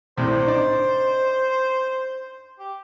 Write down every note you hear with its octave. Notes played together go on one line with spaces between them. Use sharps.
C2 A2 C3 C5
D4 D#4 D5
G4